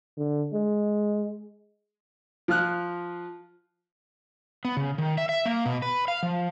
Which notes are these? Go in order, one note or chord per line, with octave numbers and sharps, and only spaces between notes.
D3
G#3
F3 F4 F6 F#6
B3
C#3
D#3
E5
E5
A#3
B2
B4
F5
F3